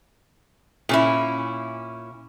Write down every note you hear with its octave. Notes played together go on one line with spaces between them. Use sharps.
A#2 C#4 E4